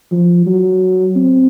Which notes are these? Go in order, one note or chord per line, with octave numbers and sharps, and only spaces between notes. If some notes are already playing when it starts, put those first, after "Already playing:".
F3
F#3
C4